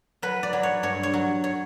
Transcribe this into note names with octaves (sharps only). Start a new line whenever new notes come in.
F#3 B4
D5
F#3
C#5
G2 C#5
C#5
F#3
C#5